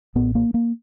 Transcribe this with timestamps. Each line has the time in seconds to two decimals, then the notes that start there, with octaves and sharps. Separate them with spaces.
0.15 A1 A2 B3
0.35 A#3
0.54 A#3